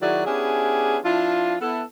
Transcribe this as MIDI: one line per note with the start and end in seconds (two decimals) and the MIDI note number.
0.01 0.22 51
0.01 0.22 54
0.01 0.22 64
0.01 0.22 66
0.01 0.22 68
0.01 0.22 74
0.26 0.98 59
0.26 0.98 61
0.26 0.98 62
0.26 0.98 64
0.26 0.98 67
0.26 0.98 68
1.04 1.55 53
1.04 1.55 62
1.04 1.55 64
1.04 1.55 65
1.61 1.83 59
1.61 1.83 64
1.61 1.83 69